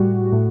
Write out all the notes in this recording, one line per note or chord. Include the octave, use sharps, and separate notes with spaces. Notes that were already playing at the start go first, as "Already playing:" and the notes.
Already playing: A2 G3 F#4
A2